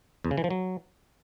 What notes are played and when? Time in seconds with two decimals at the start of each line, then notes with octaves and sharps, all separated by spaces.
0.25 E2
0.31 C#3
0.37 E3
0.44 F3
0.50 F#3